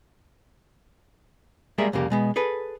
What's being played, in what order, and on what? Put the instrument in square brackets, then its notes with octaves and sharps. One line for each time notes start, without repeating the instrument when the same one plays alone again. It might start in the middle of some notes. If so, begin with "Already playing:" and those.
[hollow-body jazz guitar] G3 G#3 A#3 G#4 A#4 E5
C2 F2 C#3 A#3 G4
B2 G#3 B3
G#4 A4 B4